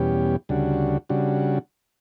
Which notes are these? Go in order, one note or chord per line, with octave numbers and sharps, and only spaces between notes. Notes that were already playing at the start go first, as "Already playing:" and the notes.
Already playing: E2 B2 G3 C#4 G4
D2 C#3 G3 D4 F#4
C#3 G3 D4 F#4